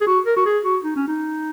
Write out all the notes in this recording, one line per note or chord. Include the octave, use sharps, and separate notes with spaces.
G#4
F#4
A#4
F#4
G#4
F#4
D#4
C#4
D#4